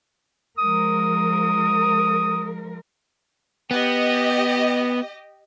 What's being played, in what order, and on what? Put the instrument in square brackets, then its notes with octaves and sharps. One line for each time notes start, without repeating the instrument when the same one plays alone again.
[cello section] F3 G#3 A#4 [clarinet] D#6
[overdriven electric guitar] B3 [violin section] G4 D#5